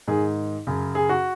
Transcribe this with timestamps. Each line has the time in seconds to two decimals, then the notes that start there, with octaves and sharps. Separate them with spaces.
0.07 G#2 D#3 G#4
0.67 F#2 C#3
0.95 G#4
1.09 F#4